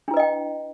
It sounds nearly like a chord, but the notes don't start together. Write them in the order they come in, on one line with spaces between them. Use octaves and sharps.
D4 E4 B4 D#5 G5